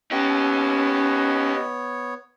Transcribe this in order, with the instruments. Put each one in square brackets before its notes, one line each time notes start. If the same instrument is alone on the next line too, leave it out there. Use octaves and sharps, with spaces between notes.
[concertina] B3 C#5 [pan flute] C#4 [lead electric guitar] D#4 G4